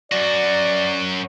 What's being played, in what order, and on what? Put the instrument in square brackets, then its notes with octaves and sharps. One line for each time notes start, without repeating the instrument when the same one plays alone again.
[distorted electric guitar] F#2 F#4 [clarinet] D5